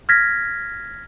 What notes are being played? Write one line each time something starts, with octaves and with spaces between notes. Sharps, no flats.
F6 G#6 A#6 B6